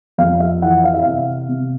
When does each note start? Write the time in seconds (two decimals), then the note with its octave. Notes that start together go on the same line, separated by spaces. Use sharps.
0.18 F2 F5
0.40 E5
0.62 E3 F#5
0.84 F5
0.94 E5
1.02 C3 F5
1.49 C3